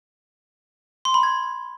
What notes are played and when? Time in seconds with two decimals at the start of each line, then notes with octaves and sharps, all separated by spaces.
1.05 C6
1.14 B5
1.23 G#6